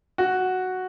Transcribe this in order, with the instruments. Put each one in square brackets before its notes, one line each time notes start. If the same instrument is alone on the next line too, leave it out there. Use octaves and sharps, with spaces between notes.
[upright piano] F#4